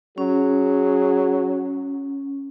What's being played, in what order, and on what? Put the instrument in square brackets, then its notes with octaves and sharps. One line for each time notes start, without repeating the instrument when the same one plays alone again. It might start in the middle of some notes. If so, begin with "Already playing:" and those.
[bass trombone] F#3 [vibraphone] C#4 [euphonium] G#4